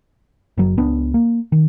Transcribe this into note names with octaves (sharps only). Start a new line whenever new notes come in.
F#1 F#3
C#2 B3 D4
A#3
D#3